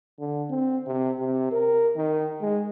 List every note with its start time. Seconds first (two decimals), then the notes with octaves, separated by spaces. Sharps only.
0.20 D3
0.50 C4
0.87 C3
1.19 C3
1.52 A#4
1.96 D#3
2.41 G#3